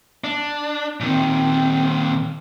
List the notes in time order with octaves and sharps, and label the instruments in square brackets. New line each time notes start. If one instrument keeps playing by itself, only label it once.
[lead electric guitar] D4
[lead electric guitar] A#2 D#3 [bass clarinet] C4